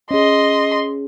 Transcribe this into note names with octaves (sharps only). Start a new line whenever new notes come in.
C#4 G#4 D#5 C6